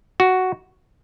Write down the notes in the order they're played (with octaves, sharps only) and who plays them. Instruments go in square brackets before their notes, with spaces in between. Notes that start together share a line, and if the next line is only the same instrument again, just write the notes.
[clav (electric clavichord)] F#4